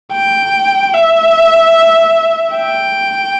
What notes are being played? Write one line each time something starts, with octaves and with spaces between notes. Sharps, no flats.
G5
E5
G5